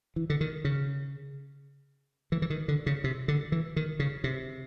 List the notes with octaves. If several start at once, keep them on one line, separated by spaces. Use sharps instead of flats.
E3
D3
D#3
C#3
E3
E3
D#3
D3
C#3
C3
D3
E3
D#3
C#3
C3